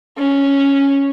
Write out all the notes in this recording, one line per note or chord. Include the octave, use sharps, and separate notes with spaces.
C#4